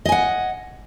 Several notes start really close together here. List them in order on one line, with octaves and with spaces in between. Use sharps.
D#5 G#5 F#5